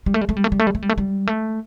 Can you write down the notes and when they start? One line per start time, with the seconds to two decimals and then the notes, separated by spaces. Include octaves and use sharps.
0.06 G3
0.14 A3
0.21 G3
0.29 A3
0.37 G3
0.44 A3
0.52 G3
0.59 A3
0.67 G3
0.75 A3
0.82 G3
0.89 A3
0.98 G3
1.27 A3